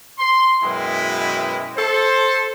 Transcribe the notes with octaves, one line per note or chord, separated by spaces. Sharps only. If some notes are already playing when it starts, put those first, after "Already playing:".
C6
F#2 B2 G#3 E4 B4 G5
A4 C5